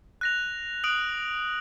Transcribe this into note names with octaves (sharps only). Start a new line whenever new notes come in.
F#6 A#6 F7
D#6 F#6 D7 F#7